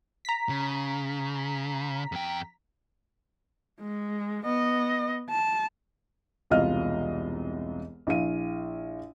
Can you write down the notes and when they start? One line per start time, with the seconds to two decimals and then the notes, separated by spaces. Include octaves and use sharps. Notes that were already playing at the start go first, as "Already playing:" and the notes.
0.25 A#5 B6
0.49 C#3
2.12 F2 G5
3.81 G#3
4.45 B3 D#5
5.30 A5
6.50 E1 C2 F4 D#5 F6
8.07 A#1 E4 F5 D#7